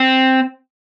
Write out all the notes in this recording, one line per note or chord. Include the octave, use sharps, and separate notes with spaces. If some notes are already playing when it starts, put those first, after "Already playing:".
Already playing: C4